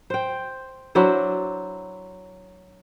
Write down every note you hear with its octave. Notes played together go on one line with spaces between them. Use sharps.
C5 G5
F#3 D4 E4 C5